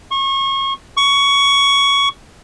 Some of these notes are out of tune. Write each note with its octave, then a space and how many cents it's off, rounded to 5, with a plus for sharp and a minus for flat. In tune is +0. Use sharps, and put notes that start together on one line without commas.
C#6 -30
C#6 +15